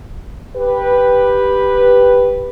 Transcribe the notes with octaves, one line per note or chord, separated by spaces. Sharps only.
G4 B4